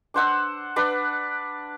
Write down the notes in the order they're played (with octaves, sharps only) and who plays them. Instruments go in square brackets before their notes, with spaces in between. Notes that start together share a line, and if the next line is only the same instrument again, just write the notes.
[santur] D4 C5 F#5 E6
D4 B4